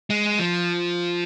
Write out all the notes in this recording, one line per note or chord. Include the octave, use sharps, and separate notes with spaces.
G#3
F3